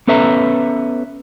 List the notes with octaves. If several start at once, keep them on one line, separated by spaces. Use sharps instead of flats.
B3 C#4 A4 B4 E5 A#5